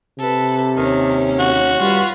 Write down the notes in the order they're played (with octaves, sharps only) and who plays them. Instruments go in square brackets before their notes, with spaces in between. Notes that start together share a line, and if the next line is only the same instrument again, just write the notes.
[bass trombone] C3 [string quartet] A4 B4
[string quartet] D#2 C#4 [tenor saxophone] D#3
[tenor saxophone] F#4
[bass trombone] G3 [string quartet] F4 B4